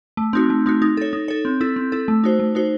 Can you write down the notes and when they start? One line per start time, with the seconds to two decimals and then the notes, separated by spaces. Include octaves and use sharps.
0.17 A3
0.33 C4 D#4 F#4
0.50 A3
0.66 C4 D#4 F#4
0.82 D#4
0.97 A4 C#5
1.13 D#4
1.28 A4 C#5
1.45 C4
1.61 E4 A4
1.76 C4
1.92 E4 A4
2.08 A3
2.24 D#4 F#4 C5
2.39 A3
2.55 D#4 F#4 C5